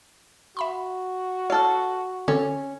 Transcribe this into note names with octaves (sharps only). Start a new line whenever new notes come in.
F#4 E5 B5 C6
A4 C#5 F5 F6
D3 C4 C#4 A4